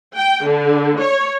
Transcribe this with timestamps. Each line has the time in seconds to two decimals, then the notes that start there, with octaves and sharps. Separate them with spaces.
0.15 G5
0.46 D3
1.00 C#5